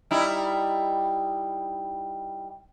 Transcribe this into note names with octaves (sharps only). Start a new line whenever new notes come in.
G3 D#4 E4